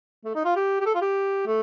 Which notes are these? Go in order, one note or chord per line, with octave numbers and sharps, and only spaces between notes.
A3
D#4
F4
G4
G4
A4
F4
G4
A3